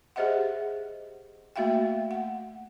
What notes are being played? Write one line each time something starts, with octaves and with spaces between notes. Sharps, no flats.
G4 G#4 C5 D#5 E5 F#5
A3 A#3 F#4 E5 F5 G5
F#5